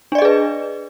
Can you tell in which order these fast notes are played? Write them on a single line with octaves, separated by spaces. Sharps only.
D4 D5 D#5 G#4 B4